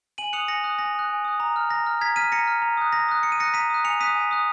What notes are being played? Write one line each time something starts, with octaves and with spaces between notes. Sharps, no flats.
G#5 D#7 F#7
D#6 F#6 C#7 F7
G#5 A#6 C#7
D#6 F#6
G#5 A#6
D#6 F#6
G#5
D#6 F#6
A#5
F6
A#5 A#6
F6
A#5 G#6 B6
F6 B6 D#7
A#5 A#6 C#7
F6
A#5
D#6 F#6
A#5 A#6
D#6 F#6
A#5 C#7
D#7
D#6 F#6 A#6 C#7
A#5 B6 D#7
D#6 F#6
G#5 C#7 F7
D#6 F#6 B6 D#7
G#5
D#6 F#6